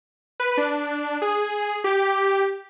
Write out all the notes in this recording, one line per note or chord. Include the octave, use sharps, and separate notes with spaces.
B4
D4
G#4
G4